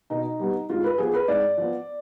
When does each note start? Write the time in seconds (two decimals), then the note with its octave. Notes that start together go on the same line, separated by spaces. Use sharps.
0.10 B2 D#4
0.39 G3 B3
0.69 G#2 F4
0.84 B4
0.98 F3 B3 G#4
1.14 B4
1.28 G#2 D5
1.57 F3 B3